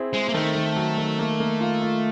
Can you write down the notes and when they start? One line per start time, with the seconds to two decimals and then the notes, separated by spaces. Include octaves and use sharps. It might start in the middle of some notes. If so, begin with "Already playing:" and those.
Already playing: C4 E4 G#4
0.13 G#3 C4
0.29 A#3
0.34 D#3 A3
0.55 D#3
0.76 F#3
0.98 D#3
1.19 A#3
1.40 A#3
1.60 F4
1.82 F4